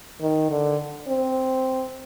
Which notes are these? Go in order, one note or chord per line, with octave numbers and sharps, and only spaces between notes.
D#3
D3
C4